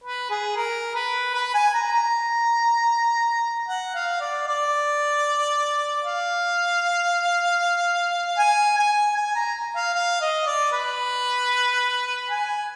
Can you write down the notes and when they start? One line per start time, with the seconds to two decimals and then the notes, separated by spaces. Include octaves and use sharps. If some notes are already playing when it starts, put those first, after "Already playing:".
0.04 B4
0.30 G#4
0.56 A#4
0.95 B4
1.34 B4
1.54 G#5
1.74 A#5
1.93 A#5
3.69 F#5
3.95 F5
4.21 D5
4.48 D5
6.04 F5
8.38 G#5
8.78 G#5
9.17 G#5
9.36 A#5
9.76 F5
9.94 F5
10.21 D#5
10.47 D5
10.73 B4
12.30 G#5